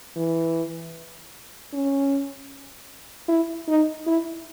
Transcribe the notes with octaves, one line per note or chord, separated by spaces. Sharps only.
E3
C#4
E4
D#4
E4